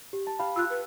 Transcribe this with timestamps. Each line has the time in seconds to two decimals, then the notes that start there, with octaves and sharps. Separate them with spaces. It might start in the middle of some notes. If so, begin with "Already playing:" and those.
0.13 G4
0.27 A5
0.39 G4 F5 B5
0.56 F4 E6 F#6
0.70 B4